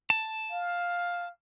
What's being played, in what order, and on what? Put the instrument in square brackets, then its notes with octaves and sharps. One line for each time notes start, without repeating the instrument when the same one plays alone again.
[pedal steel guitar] A5
[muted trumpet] F5